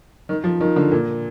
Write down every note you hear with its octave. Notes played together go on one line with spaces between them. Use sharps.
D#3
F3
D#3
D3
A#2